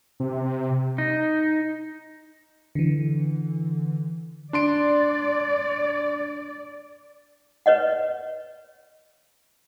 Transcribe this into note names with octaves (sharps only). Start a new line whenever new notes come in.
C3
D#4
D3 E3
D4 D5 C6 D7
B4 C#5 D#5 F#5